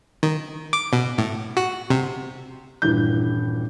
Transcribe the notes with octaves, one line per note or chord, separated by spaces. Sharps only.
D#3
D6
B2
A2
F#4
C3
D#1 G2 E3 G6